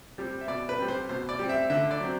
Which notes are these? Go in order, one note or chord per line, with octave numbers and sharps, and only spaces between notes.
G3 C4
E5
B2 D5
B4
G3 C4
C5
B2 C5
D5
G3 C4
E5
D3 E5
D5
F#3 C4